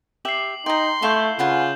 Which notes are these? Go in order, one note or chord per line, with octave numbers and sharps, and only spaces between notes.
G4 E5 G5 C7 F#7
D#4 G5 A#5 C6
A3 E4 F5 C#6 G6 E7 G7
C#3 F4 B4 F#5 G#5